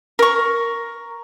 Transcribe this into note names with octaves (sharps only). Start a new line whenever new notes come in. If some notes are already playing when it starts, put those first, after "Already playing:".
A#4 C#6